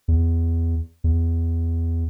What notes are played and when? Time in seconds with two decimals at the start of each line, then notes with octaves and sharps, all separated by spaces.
0.08 E2
1.04 E2